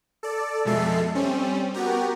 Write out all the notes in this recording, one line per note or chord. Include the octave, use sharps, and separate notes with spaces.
A4 D5
F2 B2 G#3 A4 E5 C7
G3 C4 C#4
B3 F#4 G4 A#4